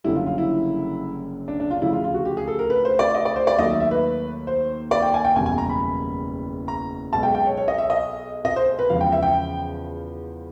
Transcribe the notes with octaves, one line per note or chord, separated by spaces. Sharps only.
F#1 F#2 D3 G3 E4
F4
F4
E4
D4
D4
F4
D2 C#3 F3 A3 E4
F4
F4
F#4
G4
G#4
A4
A#4
B4
C5
D5
D#5
D5
C5
D5
D#2 D#3 F#3 A3 D#5
E5
E5
B4
C5
D5
G5
G#5
G5
F#1 E2 B2 G3 G#5
G#5
A#5
B5
A#5
B1 B2 G#3 A5
G5
G5
C#5
C#5
D#5
E5
D#5
D#5
C5
B4
E2 C#3 F3 G#3 F5
G5
E5
G5